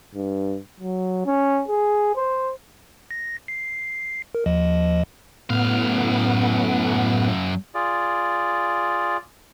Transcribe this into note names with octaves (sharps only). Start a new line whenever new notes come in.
G2
F#3
C#4
G#4
C5
A#6
C7
A#4
D#2 F3 D#5
F#2 A2 B3 F5
F4 G#4 D5